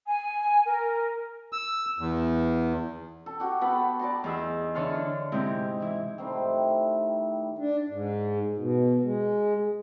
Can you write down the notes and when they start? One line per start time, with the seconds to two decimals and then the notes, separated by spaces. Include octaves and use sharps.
0.07 G#5
0.65 A#4
1.53 E6
1.99 E2
3.26 A4
3.40 F#4 G4
3.61 B3 A4 A5 B5
3.99 D5 A5 A#5 C6
4.24 E2 D#4 G#4 E6
4.75 D3 E3 C#5 A5 C6 F6
4.94 D4
5.32 G#2 C3 G#3 C4 D#4 E4
5.80 E3 E4
6.18 A2 D#3 G3 C4
7.58 D4
7.89 G#2
8.57 B2
9.03 G#3